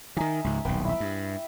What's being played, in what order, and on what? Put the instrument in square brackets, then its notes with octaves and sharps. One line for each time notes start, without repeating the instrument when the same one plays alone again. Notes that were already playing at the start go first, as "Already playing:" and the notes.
[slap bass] D#3 E3 [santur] D#4 E5 G#5
[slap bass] C#2 G#2
[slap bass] D#1 B1 [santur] B4 G5
[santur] E4 E5
[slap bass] G2